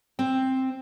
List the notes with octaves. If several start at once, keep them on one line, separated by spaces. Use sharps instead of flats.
C4